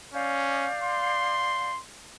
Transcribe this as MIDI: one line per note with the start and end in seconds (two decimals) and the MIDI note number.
0.14 0.68 61
0.14 1.71 74
0.14 1.71 77
0.14 1.71 91
0.83 1.80 84